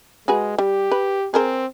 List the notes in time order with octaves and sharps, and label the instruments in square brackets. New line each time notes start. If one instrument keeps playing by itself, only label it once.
[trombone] G#3 [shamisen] F#4 G#4 B4
[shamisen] G3 [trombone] G4
[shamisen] B4
[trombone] C4 [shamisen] G#4 A#4 C5